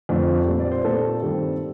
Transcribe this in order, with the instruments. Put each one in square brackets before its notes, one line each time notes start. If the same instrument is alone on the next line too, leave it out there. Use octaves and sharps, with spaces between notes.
[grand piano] F2 D3 F3 A3
A#2 G3 C4
D5
C5
A#2 A3 C4 A4
G2 D#3 G3 C4